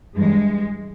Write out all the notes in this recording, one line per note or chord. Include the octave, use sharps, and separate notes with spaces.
G2 E3 G#3